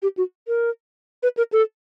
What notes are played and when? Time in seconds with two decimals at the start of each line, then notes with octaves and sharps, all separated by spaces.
0.02 G4
0.18 F#4
0.48 A#4
1.23 B4
1.37 A#4
1.53 A4